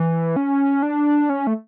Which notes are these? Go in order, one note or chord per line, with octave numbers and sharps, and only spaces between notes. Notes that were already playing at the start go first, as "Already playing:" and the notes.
Already playing: E3
C#4
D4
C#4
A3